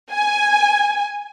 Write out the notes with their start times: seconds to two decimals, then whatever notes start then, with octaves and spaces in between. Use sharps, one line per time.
0.12 G#5